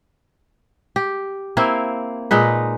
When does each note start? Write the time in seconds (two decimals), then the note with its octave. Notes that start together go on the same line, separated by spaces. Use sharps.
0.96 G4
1.57 A#3 C4 E4 F5
2.31 A#2 G#3 D#4 B4